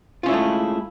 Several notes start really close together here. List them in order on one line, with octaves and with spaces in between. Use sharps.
F4 C#4 E4 G#3 A3